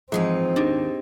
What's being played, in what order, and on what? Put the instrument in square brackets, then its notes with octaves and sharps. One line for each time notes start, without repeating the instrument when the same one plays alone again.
[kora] G#2 G#3 G#4 [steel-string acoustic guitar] E3 F3 D#4 [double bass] C4
[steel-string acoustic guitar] D#2 [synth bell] D4 D#4 G4